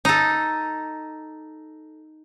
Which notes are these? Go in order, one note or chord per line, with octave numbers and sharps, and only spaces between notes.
D#4 A4